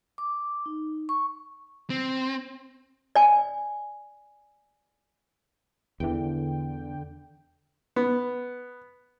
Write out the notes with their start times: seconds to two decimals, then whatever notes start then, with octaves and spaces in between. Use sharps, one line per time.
0.18 D6
0.66 D#4
1.09 C#6
1.90 C4
3.15 D5 G#5
6.00 E2 D3 E3 G5
7.96 B3